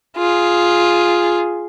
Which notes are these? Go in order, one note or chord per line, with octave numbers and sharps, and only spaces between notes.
F4 G#4